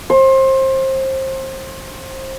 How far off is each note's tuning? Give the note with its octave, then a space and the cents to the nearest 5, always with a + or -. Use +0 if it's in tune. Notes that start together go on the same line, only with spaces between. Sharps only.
C5 +25